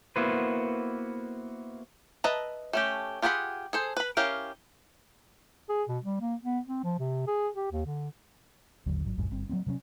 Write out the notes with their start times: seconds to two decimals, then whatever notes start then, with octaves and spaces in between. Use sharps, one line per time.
0.16 A#3 B3 E4 F#4 B4 C5
2.24 B4 D#5 E5 A5 A#5
2.73 A3 C#4 G4
3.22 F4 G4 G#4 F#5 B5
3.73 G#4 A4 C5
3.97 B4 B5
4.17 C#4 E4 G4 A#4 F5
5.69 G#4
5.88 B2
6.03 G3
6.21 A#3
6.44 B3
6.68 C4
6.84 F3
6.99 C3
7.27 G#4
7.55 G4
7.72 D#2
7.86 D3
8.86 G#1 D#2 D3 F#3
9.05 G#1 F#3
9.17 D1 A#1 F#2 G#3
9.31 G1 G2 C4
9.49 F#3 G3 A#3 C4
9.66 C3 F#3 G#3 C#4